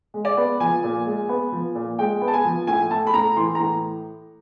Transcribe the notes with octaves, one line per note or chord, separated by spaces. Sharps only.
G#3
D5
B3
F3 G#5
A#2
G#3
B3
F3
A#2
G#3 G5
B3
A5
G#5
F3
A2 G#5
A3 A5
B5
A2 A#5
E3 C6
A#5
A2